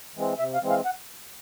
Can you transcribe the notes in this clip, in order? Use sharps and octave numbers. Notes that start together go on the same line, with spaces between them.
E3 G#3 C4
C3 E5
F5
E3 G#3 C4
F5
F#5